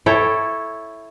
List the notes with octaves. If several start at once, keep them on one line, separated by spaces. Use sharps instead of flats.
E4 A4 C#5 G5